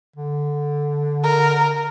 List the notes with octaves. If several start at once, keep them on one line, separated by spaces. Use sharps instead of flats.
D3
A#4